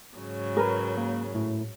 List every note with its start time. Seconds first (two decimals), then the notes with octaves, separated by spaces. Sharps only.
0.18 G#2 C#3 F#3
0.57 A#4 B4
0.97 A#3
1.35 A2